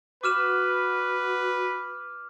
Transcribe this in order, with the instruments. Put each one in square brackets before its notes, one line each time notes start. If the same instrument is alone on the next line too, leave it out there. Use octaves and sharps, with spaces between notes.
[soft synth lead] F#4 [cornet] B4 [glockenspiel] D6 F6 E7